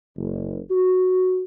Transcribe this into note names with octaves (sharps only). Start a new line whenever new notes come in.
F#1
F#4